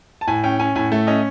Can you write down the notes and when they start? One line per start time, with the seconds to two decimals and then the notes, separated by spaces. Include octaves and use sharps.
0.21 A5
0.28 A2 G#5
0.44 C#4 G5
0.59 C#4 G#5
0.75 A2 G#5
0.92 A3
1.07 C#4 D#5